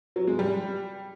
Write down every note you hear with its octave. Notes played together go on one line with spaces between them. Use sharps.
F#3
G#3
G3